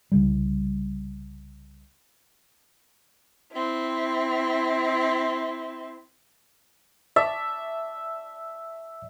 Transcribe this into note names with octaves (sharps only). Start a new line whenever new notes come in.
C2 C#3 G3
C4 E4
D5 E5 A5